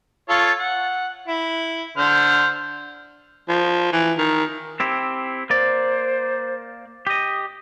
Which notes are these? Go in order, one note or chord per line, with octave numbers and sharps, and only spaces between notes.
F4 A4 C#5
F#5
E4
D3 C5 F6
F3
E3
D#3
C4 E4 G4
A#3 C5 D5
G4 D#5 D#6